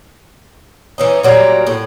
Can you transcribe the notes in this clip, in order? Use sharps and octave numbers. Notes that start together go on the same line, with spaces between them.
E3 C#4 D#4
A#2 F#3 G3 A#3
A2